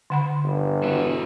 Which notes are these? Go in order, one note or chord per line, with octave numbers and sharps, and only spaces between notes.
D3 F#5 B5
G1
B3 E4 F#4